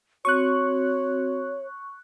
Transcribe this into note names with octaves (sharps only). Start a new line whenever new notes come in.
C4 F#4 C#5 C#6 F#6